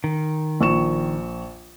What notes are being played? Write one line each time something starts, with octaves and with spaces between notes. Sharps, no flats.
D#3
A#1 C#6 E7